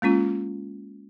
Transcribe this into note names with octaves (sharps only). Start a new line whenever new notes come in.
G#3 A#3 C#4 F4